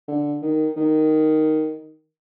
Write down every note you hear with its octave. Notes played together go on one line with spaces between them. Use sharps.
D3
D#3
D#3